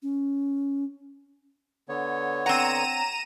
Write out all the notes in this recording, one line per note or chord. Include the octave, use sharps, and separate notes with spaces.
C#4
D3 B3 C#5
C4 F#5 A#5 D#7 E7